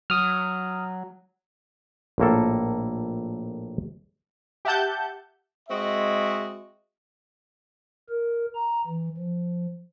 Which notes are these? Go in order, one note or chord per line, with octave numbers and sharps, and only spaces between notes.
F#3 D#6 F6
A#1 A2 A#3 A4
G4 E5 F#5 A5 G6
G#3 C4 F#4 D#5 E5
A#4
A#5
E3
F3